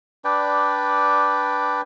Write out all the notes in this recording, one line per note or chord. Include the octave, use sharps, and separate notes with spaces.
D4 B4 D5 G5